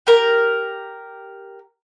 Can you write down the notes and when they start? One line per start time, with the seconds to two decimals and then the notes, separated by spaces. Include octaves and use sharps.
0.07 G4 A#4 A#5